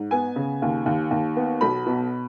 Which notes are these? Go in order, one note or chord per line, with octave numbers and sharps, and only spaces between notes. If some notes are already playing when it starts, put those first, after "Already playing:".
Already playing: G#2
B3 G#5
C#3
D#2
D#2
D#2
B3
B1 B5
B2